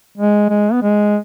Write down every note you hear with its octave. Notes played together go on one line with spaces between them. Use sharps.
G#3
G#3
B3
G#3